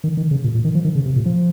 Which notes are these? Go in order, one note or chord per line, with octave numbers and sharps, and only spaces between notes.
D#3
D#3
C#3
A#2
A#2
D#3
F3
D#3
C#3
C3
A#2
F3